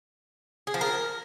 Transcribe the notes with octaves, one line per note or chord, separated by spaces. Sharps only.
G#4
F3
A#4